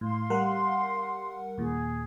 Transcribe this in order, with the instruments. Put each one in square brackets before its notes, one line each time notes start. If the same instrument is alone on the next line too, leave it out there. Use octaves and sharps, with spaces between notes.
[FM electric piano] A2 [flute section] F5 C6
[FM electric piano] G3 A#4 F#5
[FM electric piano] D#2 A#2 [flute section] G#4